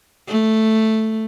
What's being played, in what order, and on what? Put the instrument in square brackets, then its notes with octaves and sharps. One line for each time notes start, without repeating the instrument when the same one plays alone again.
[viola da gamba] A3